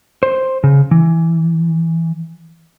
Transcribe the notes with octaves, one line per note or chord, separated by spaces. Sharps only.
C5
C#3
E3